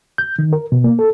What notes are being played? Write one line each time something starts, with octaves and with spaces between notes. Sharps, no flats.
G6
D#3
A#4
B2
A#3
A4